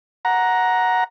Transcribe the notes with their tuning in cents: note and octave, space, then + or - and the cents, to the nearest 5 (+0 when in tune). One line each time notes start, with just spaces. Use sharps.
F#5 -5 A#5 +10